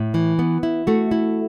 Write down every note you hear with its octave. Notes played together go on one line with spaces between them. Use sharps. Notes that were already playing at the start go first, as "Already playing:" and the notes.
Already playing: A2
E3
B3
E4
A3 F#4
E4